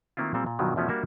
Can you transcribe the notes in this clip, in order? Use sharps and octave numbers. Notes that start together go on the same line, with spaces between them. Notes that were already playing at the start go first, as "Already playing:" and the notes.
D#3 A3 A#3 C4 E4 F4
A#2 G3 C4 A4
A#2
G2 B2 D#3 F3 F#3
E2 B2 F3 A3 C#4
G3 A#3 D4 F#4 A#4 E5